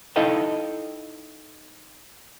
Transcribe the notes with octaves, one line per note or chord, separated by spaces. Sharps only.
D#4 E4 A4 D#5 F5 G5